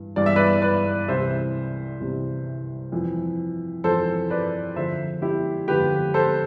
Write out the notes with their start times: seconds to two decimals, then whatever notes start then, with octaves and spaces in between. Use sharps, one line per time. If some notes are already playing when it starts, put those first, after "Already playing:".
Already playing: G2 E3
0.16 G2 E3 D5
0.26 E5
0.36 B4 D5
0.62 B4 D5
1.08 C2 C3 E3 C5 E5
2.00 C2 C3 E3
2.92 F2 E3
3.84 F2 E3 A4 C5
4.30 B4 D5
4.76 F2 D3 F3 C5 E5
5.22 E4 G4
5.68 F2 D3 F3 G4 B4
6.14 A4 C5